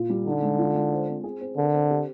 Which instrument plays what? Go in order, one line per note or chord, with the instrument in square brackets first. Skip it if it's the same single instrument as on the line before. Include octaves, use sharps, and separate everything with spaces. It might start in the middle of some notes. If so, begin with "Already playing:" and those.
Already playing: [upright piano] A#2 F4
G3
[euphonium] D3 [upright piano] D#4
[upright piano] G#3
F4
G#3
C5
C4
G#4
C4
[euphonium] D3 [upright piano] A#4
[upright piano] C4
G4